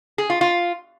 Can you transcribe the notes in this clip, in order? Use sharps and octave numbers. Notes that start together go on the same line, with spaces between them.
G#4
F4
F4